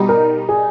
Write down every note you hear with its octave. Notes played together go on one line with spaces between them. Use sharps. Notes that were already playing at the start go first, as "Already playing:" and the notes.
Already playing: B2 G3 D#4
A#4
G#4